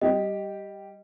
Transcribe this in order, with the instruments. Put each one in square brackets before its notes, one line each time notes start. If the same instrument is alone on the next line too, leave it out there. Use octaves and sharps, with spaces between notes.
[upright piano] G3 G4 [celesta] D#5